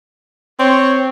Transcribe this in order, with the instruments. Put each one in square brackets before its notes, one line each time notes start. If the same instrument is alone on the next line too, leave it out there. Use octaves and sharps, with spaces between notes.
[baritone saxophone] C4 [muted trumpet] C#5